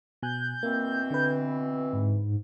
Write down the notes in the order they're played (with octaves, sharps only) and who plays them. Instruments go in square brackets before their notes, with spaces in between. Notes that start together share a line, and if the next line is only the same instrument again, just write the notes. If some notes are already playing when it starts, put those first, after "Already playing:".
[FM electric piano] B2 G#5 F#6 [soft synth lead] G6
[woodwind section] B2 E3 C4 [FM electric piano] A#3
[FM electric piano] D3 B4
[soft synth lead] G#2